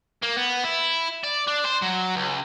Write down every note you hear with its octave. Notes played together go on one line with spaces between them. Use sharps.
A#3
B3
E4
D5
D4
C5
F#3
C#2